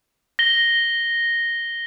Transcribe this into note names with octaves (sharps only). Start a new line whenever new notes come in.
A#6 G7